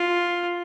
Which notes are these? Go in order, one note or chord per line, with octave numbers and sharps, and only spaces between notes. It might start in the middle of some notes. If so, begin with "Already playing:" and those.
Already playing: F4